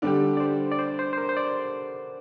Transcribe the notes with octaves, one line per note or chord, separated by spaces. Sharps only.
D3 G3 D4 G4 D5
D5
C5
D5
C5
C5
C5
A#4
C5
D5